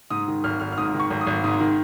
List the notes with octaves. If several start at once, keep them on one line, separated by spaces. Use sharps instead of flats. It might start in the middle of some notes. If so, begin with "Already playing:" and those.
G#2 D#6
D#3
G#1 F6
G#1 F6
F6
G#2 D#6
D#3
C#6
G#1
D#6
G#1
G#2 D#6
D#3